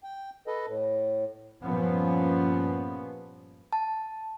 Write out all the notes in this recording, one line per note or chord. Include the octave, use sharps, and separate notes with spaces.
G5
A4 B4 D#5
A2
G2 A#2 F3 B3 C#4
A5